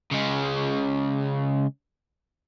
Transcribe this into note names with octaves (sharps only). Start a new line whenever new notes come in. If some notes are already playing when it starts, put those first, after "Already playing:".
C#3 G#3